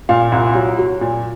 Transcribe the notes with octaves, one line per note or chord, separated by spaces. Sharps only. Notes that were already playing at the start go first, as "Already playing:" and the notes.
A#2 F5
C2
F#3
F#3
A#2